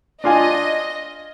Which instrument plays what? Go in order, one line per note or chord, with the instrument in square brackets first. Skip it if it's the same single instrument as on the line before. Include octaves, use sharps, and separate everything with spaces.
[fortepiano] D4 F4 G#5 [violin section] D#5